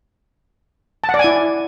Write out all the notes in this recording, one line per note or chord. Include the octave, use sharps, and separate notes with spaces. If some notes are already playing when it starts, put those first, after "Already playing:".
A5
F#5
D5
G#5
E4